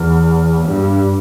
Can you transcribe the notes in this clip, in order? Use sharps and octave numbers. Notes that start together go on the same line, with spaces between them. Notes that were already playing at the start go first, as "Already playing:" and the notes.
Already playing: E2
G2